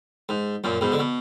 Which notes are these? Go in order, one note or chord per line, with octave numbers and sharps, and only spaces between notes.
G#2
F#2 A#2
G#2 B2
D3
B2